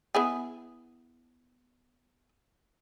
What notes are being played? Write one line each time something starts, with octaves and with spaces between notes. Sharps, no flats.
B3 E4 G#4